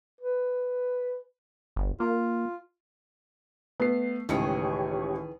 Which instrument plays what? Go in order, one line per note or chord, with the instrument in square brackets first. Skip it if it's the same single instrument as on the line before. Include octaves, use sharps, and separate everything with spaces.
[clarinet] B4
[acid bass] G1
[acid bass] A#3 [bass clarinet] F4
[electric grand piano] A3 C7 [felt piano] B3
[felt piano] C#2 C#7 [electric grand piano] A2 [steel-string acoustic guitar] D#3 E3 G#4 [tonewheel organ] G4 C#5